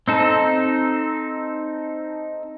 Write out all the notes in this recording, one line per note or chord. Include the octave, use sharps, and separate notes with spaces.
C4 D#4 A4